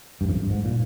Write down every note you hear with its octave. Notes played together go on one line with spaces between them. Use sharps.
G2
F2
G2
G#2
A#2